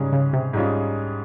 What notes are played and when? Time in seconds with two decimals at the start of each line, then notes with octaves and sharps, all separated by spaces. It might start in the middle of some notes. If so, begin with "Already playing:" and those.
Already playing: G#2 C#3 G3 C#4 G#4
0.13 C#3
0.33 C3
0.53 G#2 G3 C#4 F4 G#4